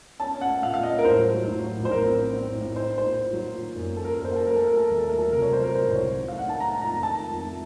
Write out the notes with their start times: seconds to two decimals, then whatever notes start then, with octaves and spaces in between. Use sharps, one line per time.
0.20 C#4 A5
0.35 C#4
0.41 F#5
0.48 A3
0.62 A#2 F5
0.74 A#2 F5
0.83 D#5
0.91 C#4
0.98 A#4
1.05 A2 C5
1.19 F#3
1.34 F#3
1.48 A2
1.62 F#3
1.77 A#1
1.85 C5
1.90 A2 A#4
2.04 C4
2.18 C4
2.34 C4
2.47 A2
2.61 A2
2.76 D#4 C5
2.90 D#4
2.98 C5
3.04 A#2
3.19 D#4
3.33 F#3
3.47 A#2
3.61 D#3
3.76 F#2
3.90 A#3
3.97 A4
4.03 C#4 A#4
4.15 F#2 A#4
4.25 C5
4.32 A#3 A4
4.46 F#3 A#4
4.56 A4
4.61 A3
4.67 A#4
4.76 A3 A4
4.88 D#2 A#4
4.98 A4
5.03 A3
5.09 A#4
5.18 F#3 A4
5.32 C3 A#4
5.42 F#3 C#5
5.53 C5
5.60 F#3 A#4
5.74 F#3 C5
5.88 C2 C5
5.95 C#5
6.03 F#3
6.17 D#4
6.28 A3 F5
6.39 F#5
6.46 D#3 A5
6.60 D#3 A#5
6.74 D#3
6.81 A#5
6.88 F2
7.03 D#3 A5
7.16 D#3
7.30 F2
7.45 A3